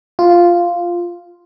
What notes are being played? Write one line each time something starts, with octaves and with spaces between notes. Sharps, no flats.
F4